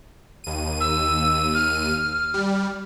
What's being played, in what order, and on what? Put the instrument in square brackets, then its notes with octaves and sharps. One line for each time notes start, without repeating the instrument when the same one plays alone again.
[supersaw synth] D#2 D#7
[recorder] E6
F6
[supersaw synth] G3